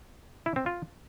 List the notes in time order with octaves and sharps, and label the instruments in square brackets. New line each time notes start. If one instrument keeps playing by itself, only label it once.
[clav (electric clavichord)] E4
C4
F4